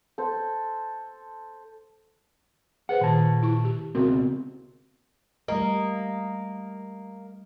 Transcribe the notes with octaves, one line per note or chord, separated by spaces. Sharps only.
A4 C5
G#4 B4 C5 F#5
A#2 D#3 A5
E4 C#6
G4
C#2 B2 C4 C#4 F#4 A#4
G3 A3 A#3 D#5